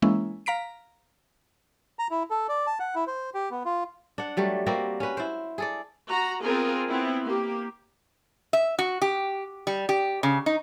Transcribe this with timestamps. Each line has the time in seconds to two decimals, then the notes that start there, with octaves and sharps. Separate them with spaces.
0.02 E3 G#3 A#3 C#4 E4
0.46 F5 A#5 B6 D7
1.99 A#5
2.11 E4
2.31 A4
2.49 D5
2.67 A5
2.80 F#5
2.95 E4
3.07 C5
3.35 G4
3.51 B3
3.65 F4
4.18 D4 F#5
4.37 F#3 G3 A3
4.66 G3 A#3 C4 F#4
5.00 C#4 B4
5.17 E4 C5
5.58 G#4 A4 D5
6.08 F#4 A#5
6.43 B3 C4 F4 G#4 A#4
6.88 B3 C4 E4
7.24 A#3 G4
8.53 E5
8.79 F#4
9.02 G4
9.67 G3
9.89 G4
10.23 C#3
10.46 D#4